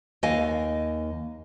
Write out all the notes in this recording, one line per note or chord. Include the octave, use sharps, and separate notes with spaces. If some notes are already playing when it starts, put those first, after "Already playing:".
D#2 D#5 F5 G#5